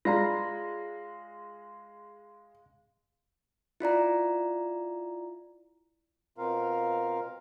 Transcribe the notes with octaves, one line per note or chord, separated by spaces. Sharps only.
G#3 F4 D5 F5 A#5 A#6
E4 F4 D5 A#5
B2 C4 F4 A#4 F5